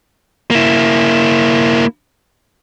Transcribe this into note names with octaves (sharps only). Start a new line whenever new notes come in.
A#3 E4